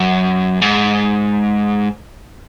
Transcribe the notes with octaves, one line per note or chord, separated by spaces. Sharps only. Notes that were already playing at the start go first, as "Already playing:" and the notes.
Already playing: F#2
G#2